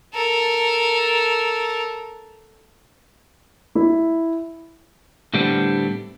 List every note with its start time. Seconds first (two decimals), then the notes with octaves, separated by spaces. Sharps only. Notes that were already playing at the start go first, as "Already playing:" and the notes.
0.14 A4 A#4
3.75 E4
5.34 A2 D3 G3 B3 C4 D4